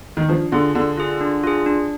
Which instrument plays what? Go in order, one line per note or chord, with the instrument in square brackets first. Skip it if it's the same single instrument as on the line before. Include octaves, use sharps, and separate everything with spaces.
[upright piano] D#3
[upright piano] F3 [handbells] D4
[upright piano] D3 [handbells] F4 G#4
[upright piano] D3 [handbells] D4
[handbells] F4 G#4
D4
F4 G#4
D4